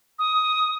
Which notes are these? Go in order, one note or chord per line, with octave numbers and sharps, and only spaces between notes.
D#6